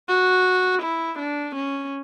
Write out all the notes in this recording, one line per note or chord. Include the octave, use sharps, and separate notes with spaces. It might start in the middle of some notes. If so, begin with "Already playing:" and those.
F#4
E4
D4
C#4